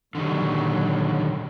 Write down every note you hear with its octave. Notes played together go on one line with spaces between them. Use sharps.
A#2 D3 D#3 F#3 G3